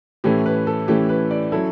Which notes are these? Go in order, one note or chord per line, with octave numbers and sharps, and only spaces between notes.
A2 E3 A3 C#4 E4 G4
B4
A4
A2 E3 A3 C#4 E4 G4
B4
D5
F#3 C#4 E4 A4